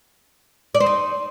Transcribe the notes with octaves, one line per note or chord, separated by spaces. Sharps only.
D5
C5
D#4